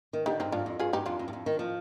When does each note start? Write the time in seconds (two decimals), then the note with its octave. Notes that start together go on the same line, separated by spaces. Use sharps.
0.13 D#3
0.26 D3 D#4 G4
0.40 G2 C4 D#4
0.52 G2 D4 F4
0.66 F2
0.79 G2 F4 G#4
0.93 G2 D#4 G4
1.06 F2 D4 F4
1.19 F2
1.28 G2
1.33 F2
1.46 D#3
1.59 F3